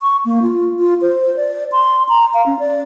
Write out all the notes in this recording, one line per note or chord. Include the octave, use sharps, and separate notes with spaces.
C#6
A#3
F4
F4
C5
D5
C6
A#5
F5
C#4
D5